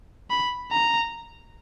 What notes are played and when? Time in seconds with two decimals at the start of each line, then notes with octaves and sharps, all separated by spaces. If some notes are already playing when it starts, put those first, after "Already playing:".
0.30 B5
0.72 A#5